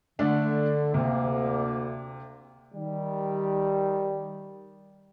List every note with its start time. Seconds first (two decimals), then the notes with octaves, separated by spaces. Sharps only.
0.19 D3 A3 D4
0.94 D2 C3 A#3
2.74 D#3 G3